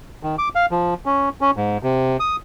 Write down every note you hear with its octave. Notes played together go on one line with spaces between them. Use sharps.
D#3
D6
F5
F3
C#4
C#4
G#2
C3
D#6